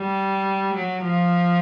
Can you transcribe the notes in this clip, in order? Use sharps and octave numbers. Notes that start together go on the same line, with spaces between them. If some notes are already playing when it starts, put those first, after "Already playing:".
Already playing: G3
F#3
F3